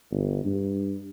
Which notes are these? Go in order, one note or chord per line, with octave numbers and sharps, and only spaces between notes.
G1
G2